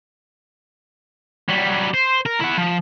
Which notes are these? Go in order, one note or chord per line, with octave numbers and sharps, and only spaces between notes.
F#3 G3
C5
A#4
E4 F#5
F3